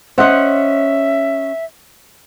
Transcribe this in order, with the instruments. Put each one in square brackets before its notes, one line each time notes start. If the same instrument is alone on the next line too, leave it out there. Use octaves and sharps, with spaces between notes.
[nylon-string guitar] C#4 D#5 [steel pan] C5 F#5 [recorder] E5